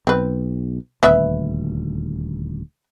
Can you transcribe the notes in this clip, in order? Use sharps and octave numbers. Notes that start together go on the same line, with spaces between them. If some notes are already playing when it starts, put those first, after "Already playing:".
B1 C4 B4
D#1 D2 B3 B4 E5